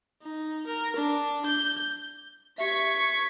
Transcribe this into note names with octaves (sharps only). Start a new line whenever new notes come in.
D#4
A#4
D4
G6
G4 E5 C#6 G#6 B6